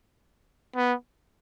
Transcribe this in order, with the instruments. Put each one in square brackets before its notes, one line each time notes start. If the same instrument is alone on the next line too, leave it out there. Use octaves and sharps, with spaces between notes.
[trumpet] B3